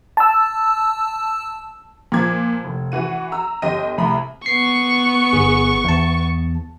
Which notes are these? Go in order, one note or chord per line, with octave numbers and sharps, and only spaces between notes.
A5 E6
A#2 F3 D6 G#6
F1
E3 F#4 D#7
A#5 E6
G1 G4 D#5 A#6 D#7
C2 A2 A#5 B5
B3 C#6 C7
G1 G#4
E2 A5